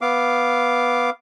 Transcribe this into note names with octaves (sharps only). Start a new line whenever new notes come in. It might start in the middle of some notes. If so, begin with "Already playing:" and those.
B3 F5 D6